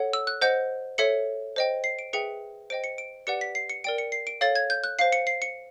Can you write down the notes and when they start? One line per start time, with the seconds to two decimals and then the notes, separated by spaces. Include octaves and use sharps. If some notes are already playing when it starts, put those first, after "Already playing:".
Already playing: A4 C#5 F#5
0.13 E6
0.27 F#6
0.42 C5 D#5 F#5 G6
0.98 A4 C#5 E5 C#7
1.56 C5 D#5 G5
1.84 C7
1.99 D7
2.13 G#4 B4 E5 G5 C#7
2.70 C5 D#5 G5 D7
2.84 C#7
2.98 D7
3.27 G4 B4 D5 F#5 C#7
3.41 B6
3.55 C7
3.70 C#7
3.84 A#4 D5 G5 D7
3.98 C#7
4.12 C7
4.27 D7
4.41 A4 C#5 F5 A6
4.55 G#6
4.70 G6
4.84 F#6
4.99 C5 F5 C7
5.12 C#7
5.27 C7
5.42 C#7